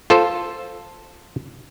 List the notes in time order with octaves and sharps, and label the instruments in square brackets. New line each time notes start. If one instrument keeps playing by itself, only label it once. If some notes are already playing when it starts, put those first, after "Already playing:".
[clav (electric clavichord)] F4 A4 C5